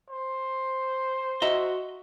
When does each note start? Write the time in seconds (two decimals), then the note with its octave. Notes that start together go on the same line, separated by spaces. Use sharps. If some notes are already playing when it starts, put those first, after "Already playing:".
0.10 C5
1.42 F#4 D#5 E5 A#5